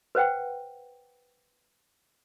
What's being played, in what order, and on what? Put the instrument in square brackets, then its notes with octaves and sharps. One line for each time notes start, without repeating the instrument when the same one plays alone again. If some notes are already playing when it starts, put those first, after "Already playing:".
[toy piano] B4 C5 F#5 G5